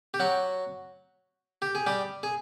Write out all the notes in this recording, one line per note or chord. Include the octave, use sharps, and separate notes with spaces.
G4
F#3 F#4
G4
G#4
G3 G4
G#4